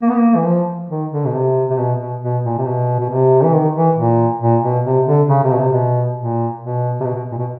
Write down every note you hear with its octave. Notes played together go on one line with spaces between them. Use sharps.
A#3
B3
A#3
E3
F3
D#3
D3
B2
C3
C3
B2
B2
B2
A#2
C3
B2
B2
C3
E3
D#3
E3
A#2
A#2
B2
C3
D3
C#3
C3
B2
C3
B2
A#2
B2
C3
B2
B2
A#2
B2